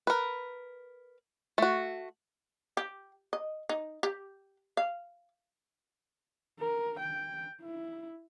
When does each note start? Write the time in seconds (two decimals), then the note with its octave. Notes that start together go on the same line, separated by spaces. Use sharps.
0.07 A#4 B4
1.58 A3 F#4
2.77 G4
3.33 D#5
3.69 D#4
4.03 G4
4.77 F5
6.59 A#4
6.99 G5
7.62 E4